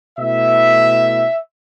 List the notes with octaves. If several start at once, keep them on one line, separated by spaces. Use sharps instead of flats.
B2 A3 E4 E5